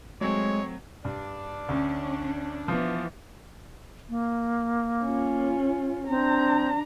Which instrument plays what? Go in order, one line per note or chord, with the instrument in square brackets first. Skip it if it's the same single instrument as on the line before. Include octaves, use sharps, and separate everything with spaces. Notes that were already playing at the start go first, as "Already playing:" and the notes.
[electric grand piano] F#3 A3 C4 [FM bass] G#3 [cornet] C#5
[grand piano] G2 [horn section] D4
[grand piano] D2 [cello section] C#4
[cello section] E3 B3 [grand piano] F3
[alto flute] A#3
[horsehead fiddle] C#4 F4
[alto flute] C4 [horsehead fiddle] D4 A#5